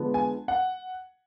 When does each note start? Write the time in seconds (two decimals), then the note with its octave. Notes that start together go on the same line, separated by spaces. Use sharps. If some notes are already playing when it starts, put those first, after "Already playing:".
Already playing: D3 F3 G#3 B3
0.14 G#5
0.48 F#5